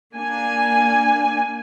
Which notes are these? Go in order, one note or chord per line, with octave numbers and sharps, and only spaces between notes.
A#3 D4 G#5